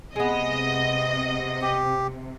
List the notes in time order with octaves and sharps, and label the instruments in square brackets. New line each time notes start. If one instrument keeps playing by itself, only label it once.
[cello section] C3 [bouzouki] G#3 B3 [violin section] D#5
[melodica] G4